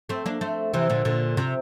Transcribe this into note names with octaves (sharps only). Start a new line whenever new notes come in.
A3 C4
A#3 D4
A3 C4
C3 E3
A#2 D3
A#2 D3
C3